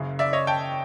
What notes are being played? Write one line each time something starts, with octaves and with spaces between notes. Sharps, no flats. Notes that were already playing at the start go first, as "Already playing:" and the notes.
Already playing: F#1 F#2 C#3
D5 E5
C#5 D#5
G5 A5